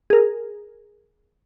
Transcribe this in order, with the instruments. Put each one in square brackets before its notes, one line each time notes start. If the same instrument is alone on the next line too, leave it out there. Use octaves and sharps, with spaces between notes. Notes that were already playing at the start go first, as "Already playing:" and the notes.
[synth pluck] G#4 A#4